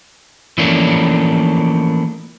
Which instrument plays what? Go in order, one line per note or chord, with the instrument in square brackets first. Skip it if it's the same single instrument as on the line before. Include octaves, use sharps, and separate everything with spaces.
[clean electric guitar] E3 F3 A3 A#3 C#4 D4